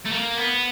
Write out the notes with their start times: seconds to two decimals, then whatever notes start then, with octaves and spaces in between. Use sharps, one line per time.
0.05 A3
0.12 A#3
0.37 B3